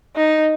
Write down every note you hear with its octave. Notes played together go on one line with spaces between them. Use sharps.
D#4